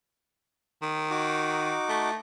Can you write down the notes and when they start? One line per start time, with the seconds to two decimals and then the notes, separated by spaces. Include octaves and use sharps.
0.82 D#3
1.11 D#4 F#4 D6
1.89 A3